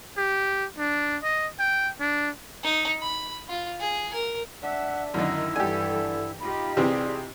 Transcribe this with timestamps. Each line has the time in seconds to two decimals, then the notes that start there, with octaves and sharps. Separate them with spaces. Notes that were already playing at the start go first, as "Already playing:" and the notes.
0.17 G4
0.78 D4
1.23 D#5
1.59 G5
2.00 D4
2.64 D#4
3.01 B5
3.49 F4
3.80 G#4
4.13 A#4
4.63 D4 E5 F#5
5.14 F#2 D3 D#3 D#4 E4
5.56 G2 D3 E3 G4 A4 G#5
6.40 D#4 F4 G4 B5
6.77 C3 E3 G3 C4 G#4